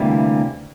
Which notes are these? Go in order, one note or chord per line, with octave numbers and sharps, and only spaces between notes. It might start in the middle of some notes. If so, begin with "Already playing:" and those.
Already playing: D2 C3 E3 G3 A#3